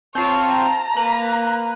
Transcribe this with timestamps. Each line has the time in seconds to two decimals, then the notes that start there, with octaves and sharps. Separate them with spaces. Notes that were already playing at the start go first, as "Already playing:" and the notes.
0.15 C4 F4 C#5 A5
0.53 A#5
0.97 A#3 B4